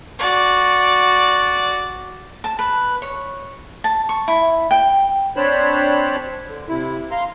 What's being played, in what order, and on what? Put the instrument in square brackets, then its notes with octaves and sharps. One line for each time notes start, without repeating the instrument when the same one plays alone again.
[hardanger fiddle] F#4 D5
[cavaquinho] A5
B4
C#5
A5
C#6
E4
G5
[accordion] C4 D4 C5 C#5 A5 B5
D3
C3 E4
F5 A#5 C6